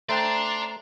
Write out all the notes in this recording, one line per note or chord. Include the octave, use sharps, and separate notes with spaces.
A3 C5 D5 G5 A5 A#5 C6